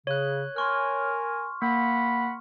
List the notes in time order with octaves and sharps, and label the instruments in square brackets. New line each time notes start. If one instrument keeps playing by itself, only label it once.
[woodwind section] C#3 [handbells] C#5 F#6
[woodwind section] A#4 G#5 [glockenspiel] C6 C#6 F6
[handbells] A#3 [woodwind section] F#5 B5